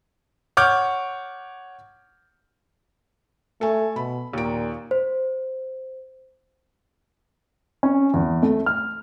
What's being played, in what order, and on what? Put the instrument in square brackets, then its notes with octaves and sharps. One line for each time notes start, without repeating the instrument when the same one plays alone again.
[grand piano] C#5 F#5 D6 F6 G6
[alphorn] A3 [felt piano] A4 G#5
[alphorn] B2 [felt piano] B5
[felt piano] D#2 D7 [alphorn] A#2
[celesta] C5
[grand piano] C#4
E2
A3
F6